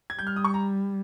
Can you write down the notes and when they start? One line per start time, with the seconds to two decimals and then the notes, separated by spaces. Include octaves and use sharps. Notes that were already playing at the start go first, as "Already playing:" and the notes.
0.10 G#6
0.18 G3 G6
0.27 F6
0.36 D#6
0.45 C#6
0.54 A#5